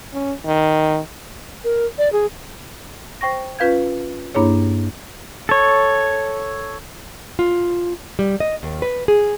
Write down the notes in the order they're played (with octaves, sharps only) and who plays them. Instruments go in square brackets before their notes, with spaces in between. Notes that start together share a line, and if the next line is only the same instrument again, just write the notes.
[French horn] C#4
D#3
[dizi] A#4
D5
G#4
[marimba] C5 G5 C#6 A#6
C#4 F4 B4 F5 G6 G#6
G2 A#3 D4 E4 G#4 C#5
[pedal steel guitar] A4 C#5
[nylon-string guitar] F4
G3
D#5
D#2
B4
G#4